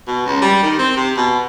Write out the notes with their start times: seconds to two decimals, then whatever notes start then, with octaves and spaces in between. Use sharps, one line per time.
0.07 B2
0.26 C#2
0.42 G3
0.62 D#3
0.79 C4
0.96 C3
1.17 B2